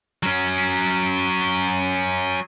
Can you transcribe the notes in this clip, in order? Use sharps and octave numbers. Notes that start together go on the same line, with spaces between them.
F#3 C#4